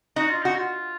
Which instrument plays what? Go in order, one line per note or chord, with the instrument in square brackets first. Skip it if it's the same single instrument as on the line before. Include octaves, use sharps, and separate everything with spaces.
[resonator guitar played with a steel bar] D#4 [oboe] F#4
[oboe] F4
[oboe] D#4 [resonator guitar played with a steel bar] F#4
[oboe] F4